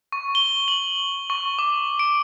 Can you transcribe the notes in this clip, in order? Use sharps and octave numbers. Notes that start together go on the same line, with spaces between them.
C#6
G7
F#7
C#6
D6
D7